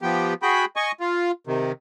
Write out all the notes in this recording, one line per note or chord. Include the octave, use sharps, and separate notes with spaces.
F3 B3 G4
F#4 G#4 G5 B5
D#5 G#5 C#6
F4
C3 D#3